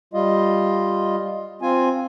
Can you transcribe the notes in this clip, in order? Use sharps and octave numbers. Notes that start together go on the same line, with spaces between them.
G3 F4 D#5
C4 F4 G#5